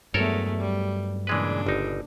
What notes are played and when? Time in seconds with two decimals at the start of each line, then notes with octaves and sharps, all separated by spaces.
0.14 E2 G2 F#3 G#3 A3 A4 A#4 C#5
0.57 G3
1.27 A#2 C#3 E3 G#3 D4 B4
1.66 G1 D#4